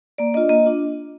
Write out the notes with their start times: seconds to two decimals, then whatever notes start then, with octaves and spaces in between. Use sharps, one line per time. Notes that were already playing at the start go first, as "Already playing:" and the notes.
0.18 A#3 D5
0.34 D4 F4 D#5
0.49 A#3 D#5
0.66 D4 F4